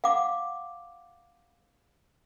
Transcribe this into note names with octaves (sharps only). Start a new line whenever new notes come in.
F5 F#5 D6